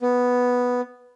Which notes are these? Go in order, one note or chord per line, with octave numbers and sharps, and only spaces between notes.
B3